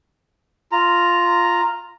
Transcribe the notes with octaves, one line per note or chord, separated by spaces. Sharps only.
F4 A#5